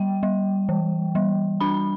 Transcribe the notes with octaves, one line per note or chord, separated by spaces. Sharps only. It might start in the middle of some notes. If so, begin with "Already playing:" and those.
Already playing: G3 G5
G3
E3
G3
D4 B5